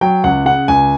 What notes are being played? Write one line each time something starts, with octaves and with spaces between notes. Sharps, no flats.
F#3 G5
C#2 F#5
C#3 F#5
C#2 G#5